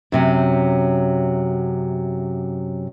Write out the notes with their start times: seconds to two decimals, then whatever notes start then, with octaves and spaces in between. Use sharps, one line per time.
0.12 F#2 C3 F#3